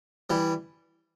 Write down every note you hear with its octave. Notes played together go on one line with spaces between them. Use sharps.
E3 G3